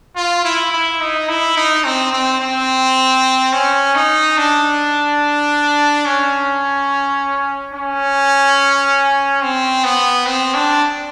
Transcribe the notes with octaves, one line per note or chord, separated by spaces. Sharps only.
F4
E4
E4
D#4
E4
D#4
C4
C4
C4
C#4
D#4
D4
C#4
C#4
C4
B3
C4
D4